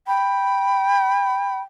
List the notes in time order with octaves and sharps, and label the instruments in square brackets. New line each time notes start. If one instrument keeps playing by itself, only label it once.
[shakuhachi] G5 [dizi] B5